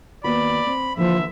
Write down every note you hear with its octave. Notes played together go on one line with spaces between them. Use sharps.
D#2 B3 F#4 D5 B5
C4
D3 E3 F3 A#3 E5